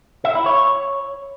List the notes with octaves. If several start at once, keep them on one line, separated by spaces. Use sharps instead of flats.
E5
E4
C#5